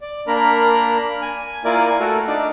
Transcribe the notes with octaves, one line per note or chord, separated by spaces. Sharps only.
D5
A#3 D4 A#4 A#5 B5
G#5
A#3 E4 F4 A#4 D5 G#5
A3 F#4 A4 A#4
D4 D#4 D5